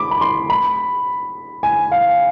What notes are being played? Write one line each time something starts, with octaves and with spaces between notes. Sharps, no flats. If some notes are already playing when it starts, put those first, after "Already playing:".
Already playing: B5 D6
B5
C6
B5
G#5
F5